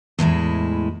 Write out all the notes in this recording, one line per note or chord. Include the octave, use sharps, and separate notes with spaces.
E2 A2 G#3 E4